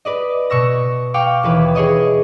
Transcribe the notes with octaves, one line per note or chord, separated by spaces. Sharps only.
B4 D5 D#5
B2 C#6 E6 A#6
F5 G5 C#6 D6
D#2 E3 B4
E4 G#4 C#5 D#5 D#6